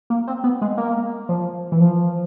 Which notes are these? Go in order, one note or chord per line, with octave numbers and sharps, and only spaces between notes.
A#3
C4
B3
G#3
A#3
F3
E3
F3